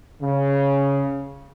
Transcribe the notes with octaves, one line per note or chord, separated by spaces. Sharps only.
C#3